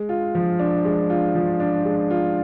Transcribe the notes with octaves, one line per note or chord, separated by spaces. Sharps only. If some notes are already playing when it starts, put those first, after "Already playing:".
Already playing: G#3
F4
F3
D4
G#3
F4
F3
D4
G#3
F4